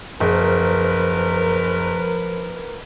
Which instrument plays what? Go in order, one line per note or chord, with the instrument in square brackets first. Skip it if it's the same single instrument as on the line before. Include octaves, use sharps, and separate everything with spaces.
[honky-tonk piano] F#1 [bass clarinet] F3 [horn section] A#4 B4